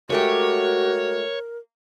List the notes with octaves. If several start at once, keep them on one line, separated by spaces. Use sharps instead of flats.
G#3 A3 F#4 G4 A#4 C#5